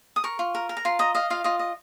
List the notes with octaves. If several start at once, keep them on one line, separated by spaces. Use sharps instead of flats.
D#6
A#4 C#6
F4
A#4
A#4
A#5
F4 C6
D#5 A#5
D#5 F5
F4 F5
F4 D#5
D#5